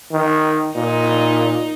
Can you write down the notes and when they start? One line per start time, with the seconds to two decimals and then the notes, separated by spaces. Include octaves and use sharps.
0.12 D#3
0.76 A#2 D#4